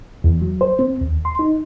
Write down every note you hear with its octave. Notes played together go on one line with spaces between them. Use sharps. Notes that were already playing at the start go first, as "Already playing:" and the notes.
E2
F#3
C5
C4
D#2
C6
D#4